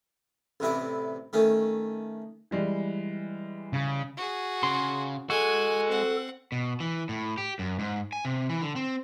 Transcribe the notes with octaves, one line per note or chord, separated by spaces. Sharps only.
A1 C3 E4 D5
D#3 A3 C#4
E3 G3 G#3
C#3
F#4 G#4
C#3 C6
G#3 F#4 A4 G#5
C4 F#5
B2
E3
A2
G4
F#2
G#2
G#5
C3
E3
D3
C4